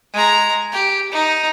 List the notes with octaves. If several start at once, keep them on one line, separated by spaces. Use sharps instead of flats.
G#3 A#5
G4
D#4